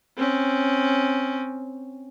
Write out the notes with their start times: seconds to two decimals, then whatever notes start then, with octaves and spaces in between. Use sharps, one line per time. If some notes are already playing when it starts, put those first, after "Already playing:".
0.17 C4 C#4